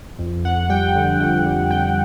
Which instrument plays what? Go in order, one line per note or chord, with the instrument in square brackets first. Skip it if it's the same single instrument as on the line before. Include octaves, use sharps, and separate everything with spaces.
[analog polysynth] F2
F2 F#5
G3 G5
D3
F2 G5
G3
F2 G5